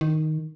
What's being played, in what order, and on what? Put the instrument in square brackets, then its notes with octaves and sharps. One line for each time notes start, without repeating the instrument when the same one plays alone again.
[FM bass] D#3